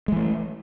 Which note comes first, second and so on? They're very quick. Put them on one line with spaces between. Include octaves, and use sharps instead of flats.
G#3 E3 A3